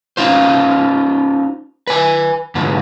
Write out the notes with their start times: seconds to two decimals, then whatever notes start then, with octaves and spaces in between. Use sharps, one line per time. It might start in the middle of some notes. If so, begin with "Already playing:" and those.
0.17 C#4 D#4 F4 C5
1.87 B4 G#5
2.55 G#2 D3 F3 B3